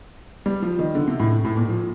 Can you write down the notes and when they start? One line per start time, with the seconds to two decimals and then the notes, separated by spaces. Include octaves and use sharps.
0.46 G3
0.62 F3
0.79 D#3
0.95 D3
1.08 C3
1.20 A2
1.45 A2
1.57 A#2
1.69 F3